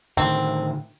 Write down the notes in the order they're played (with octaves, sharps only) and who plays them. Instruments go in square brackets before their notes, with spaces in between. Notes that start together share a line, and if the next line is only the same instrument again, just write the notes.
[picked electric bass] A2 D3 D#3 [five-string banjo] C4